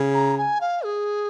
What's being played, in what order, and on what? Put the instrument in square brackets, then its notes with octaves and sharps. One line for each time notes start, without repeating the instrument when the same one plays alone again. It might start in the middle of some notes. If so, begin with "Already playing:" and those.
Already playing: [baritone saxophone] C#3
[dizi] A#5
G#5
F5
G#4